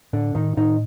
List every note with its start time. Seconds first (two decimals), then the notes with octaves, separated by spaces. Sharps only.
0.13 A2 D3 D4
0.35 A2 D#3 D#4
0.57 A2 D#3 D#4